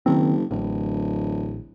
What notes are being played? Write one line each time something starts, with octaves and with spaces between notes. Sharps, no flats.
F#1 D#3 C4
D1 A1